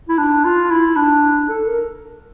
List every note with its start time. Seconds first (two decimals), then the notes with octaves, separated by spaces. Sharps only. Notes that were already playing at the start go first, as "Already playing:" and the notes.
0.08 E4
0.18 D4
0.44 F4
0.71 E4
0.96 D4
1.48 A4
1.66 A#4